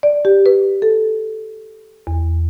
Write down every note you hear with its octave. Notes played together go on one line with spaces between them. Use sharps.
D5
G4
B4
A4
E2